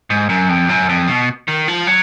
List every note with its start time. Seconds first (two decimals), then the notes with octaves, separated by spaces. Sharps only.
0.10 G#2
0.29 F#2
0.49 F2
0.69 F#2
0.89 F2
1.08 B2
1.48 D#3
1.68 F3
1.87 F#3